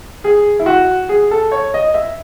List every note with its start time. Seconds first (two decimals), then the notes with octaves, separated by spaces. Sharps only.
0.24 G#4
0.59 E4
0.66 F#4
1.09 G#4
1.31 A4
1.51 C#5
1.74 D#5
1.94 E5